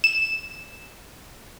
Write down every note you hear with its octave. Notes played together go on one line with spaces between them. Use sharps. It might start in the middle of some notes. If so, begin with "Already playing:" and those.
E7